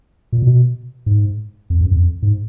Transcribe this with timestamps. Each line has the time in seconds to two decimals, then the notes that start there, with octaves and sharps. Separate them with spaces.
0.33 A#2
0.42 B2
1.06 G#2
1.70 F2
1.81 F#2
1.92 F2
2.22 G#2